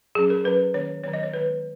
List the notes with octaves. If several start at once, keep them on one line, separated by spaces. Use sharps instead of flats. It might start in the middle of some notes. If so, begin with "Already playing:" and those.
F#3 C#4 G#4
A#4
F#3 C#4 B4
D#3 A#3 C#4 C#5
D#3 F#3 B3 C#5
D#5
C#5
D#3 G#3 B3 B4